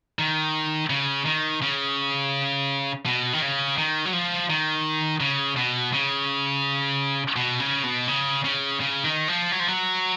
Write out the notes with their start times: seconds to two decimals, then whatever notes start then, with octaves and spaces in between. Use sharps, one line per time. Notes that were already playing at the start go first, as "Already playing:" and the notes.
0.19 D#3
0.90 C#3
1.26 D#3
1.62 C#3
3.06 B2
3.33 D#3
3.42 C#3
3.78 D#3
4.05 F#3
4.13 F3
4.50 D#3
5.20 C#3
5.56 B2
5.93 C#3
7.36 B2
7.60 C#3
7.84 B2
8.08 C#3
8.44 C#3
8.80 C#3
9.05 D#3
9.28 F3
9.52 F#3
9.60 F3
9.68 F#3